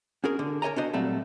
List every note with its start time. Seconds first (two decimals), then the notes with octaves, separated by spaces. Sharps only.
0.24 C#4 F#4 G#4 A#4
0.39 D3
0.62 A#4 C#5 D#5 G#5 A#5
0.76 D4 F#4 C5 D#5
0.94 A#2 F#3 G3 A3 C4 A4